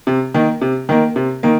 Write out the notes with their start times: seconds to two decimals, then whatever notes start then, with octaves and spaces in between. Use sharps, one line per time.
0.07 C3
0.34 D#3 A#3
0.61 C3
0.89 D#3 A#3
1.16 C3
1.43 D#3 A#3